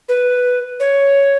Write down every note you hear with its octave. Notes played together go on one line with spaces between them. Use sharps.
B4
C#5